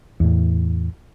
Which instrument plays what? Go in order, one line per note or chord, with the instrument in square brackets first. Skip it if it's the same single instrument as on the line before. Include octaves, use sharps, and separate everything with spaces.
[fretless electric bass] E2 A2